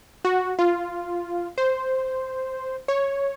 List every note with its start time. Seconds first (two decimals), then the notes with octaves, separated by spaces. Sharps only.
0.25 F#4
0.59 F4
1.58 C5
2.88 C#5